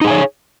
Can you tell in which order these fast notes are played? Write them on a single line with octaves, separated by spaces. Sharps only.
D#4 G#4 G#5 C#5